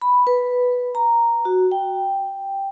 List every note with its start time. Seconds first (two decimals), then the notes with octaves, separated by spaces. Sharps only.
0.02 B5
0.27 B4
0.95 A#5
1.45 F#4
1.72 G5